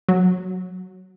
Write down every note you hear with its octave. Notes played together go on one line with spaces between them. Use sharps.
F#3